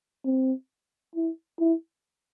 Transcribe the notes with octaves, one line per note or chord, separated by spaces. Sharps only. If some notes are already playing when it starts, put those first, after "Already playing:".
C4
E4
E4